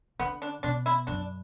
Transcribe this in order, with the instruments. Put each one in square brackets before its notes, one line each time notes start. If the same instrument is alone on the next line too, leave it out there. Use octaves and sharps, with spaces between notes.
[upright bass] D3 [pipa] B3
[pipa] D4
[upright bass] B2 [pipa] D4
[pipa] E4
[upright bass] F#2 [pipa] D4